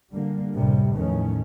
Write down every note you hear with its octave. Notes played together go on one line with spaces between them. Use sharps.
D3 G3 A#3
C2 F#2 A2 C3 G3
E2 A2 D#3 F3 A3 C#4